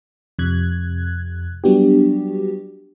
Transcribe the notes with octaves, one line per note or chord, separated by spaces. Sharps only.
F2 C3 F#6 G#6
F#3 G3 B3 D4 F#4 G4